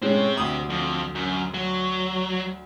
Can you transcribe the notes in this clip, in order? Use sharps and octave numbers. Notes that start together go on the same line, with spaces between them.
A2 G#3 C4 C#4 G4
D2 D#6
F2
F#2
F#3